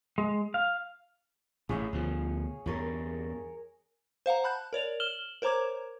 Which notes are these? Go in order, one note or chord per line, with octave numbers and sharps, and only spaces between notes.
G#3
F5
A1 A2 G#4 C#5 F5
D2 B2 F3
E2 G2 A#4 C#5 G#5
C5 F5 F#5 A#5
A5 B5 F#6 G6
A#4 C#5 D5 F7
F6 E7 F#7 G7
A#4 C5 C#5 A#5 D6 G#6